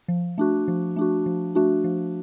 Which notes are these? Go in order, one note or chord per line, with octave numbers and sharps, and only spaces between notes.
F3
A3 D4 F#4
F3
A3 D4 F#4
F3
A3 D4 F#4
F3